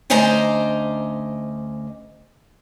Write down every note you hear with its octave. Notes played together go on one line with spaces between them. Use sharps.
D2 C#4 C5 D5 D#5 A#5